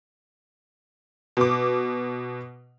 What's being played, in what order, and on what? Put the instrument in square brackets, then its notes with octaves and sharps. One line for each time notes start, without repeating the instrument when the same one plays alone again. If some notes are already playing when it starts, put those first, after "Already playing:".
[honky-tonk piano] B2 D6